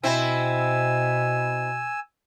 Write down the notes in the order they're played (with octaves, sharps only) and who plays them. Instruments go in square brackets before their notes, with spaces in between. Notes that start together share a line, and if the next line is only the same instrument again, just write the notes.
[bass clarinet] B2 [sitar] C4 E4 [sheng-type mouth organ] G#5 E6